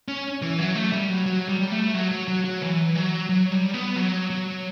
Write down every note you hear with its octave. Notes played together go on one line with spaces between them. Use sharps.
C#4
E3
F#3
A3
G3
F#3
F#3
G3
G3
A3
F#3
F#3
F#3
F#3
E3
F#3
F#3
G3
B3
F#3
F#3